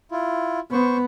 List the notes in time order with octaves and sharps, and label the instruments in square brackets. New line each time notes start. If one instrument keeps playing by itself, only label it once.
[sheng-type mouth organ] E4 F4
[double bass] B3 [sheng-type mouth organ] C5 C#6